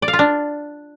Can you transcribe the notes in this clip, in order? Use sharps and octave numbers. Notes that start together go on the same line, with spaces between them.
D5
F5
F4
D4